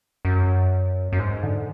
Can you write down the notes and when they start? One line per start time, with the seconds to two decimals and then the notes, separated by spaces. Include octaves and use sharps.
0.25 F#2
1.13 F#2
1.19 G#2
1.43 D3